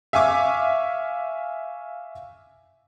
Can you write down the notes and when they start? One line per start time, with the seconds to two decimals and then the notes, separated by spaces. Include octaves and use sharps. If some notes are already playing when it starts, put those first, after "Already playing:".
0.13 E5 F5 G#5 C#6 D6